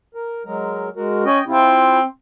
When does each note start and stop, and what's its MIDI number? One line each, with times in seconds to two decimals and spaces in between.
0.15 0.43 70
0.45 0.89 54
0.45 0.89 56
0.45 0.89 70
0.96 1.24 56
0.96 1.24 66
0.96 1.24 70
1.25 1.40 61
1.25 1.44 75
1.25 1.44 79
1.47 2.06 60
1.47 1.99 64
1.47 1.99 65